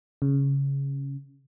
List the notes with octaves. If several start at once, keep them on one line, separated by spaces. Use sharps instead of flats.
C#3